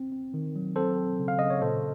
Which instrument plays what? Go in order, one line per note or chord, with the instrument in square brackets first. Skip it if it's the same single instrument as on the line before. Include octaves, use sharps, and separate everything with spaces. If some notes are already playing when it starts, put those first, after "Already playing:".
Already playing: [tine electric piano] C4
C4
D#3
F#3
C4 A4 C5
C4
C#3
F5
C#3 D#5
C#5
A#2 A4 C5